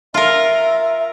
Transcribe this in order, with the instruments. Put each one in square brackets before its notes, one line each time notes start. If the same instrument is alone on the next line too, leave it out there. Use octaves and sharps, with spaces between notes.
[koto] F4 A#4 [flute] E5